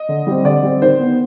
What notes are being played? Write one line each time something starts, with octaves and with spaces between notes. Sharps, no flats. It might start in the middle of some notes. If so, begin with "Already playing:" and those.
Already playing: D#5
D3
G3 C4
D3 D5
G3 C4
D#3 C5
B3